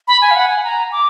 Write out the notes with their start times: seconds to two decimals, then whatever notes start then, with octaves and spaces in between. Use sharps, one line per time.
0.08 B5
0.22 G#5
0.31 F5
0.36 F#5
0.49 G#5
0.64 A#5
0.92 D6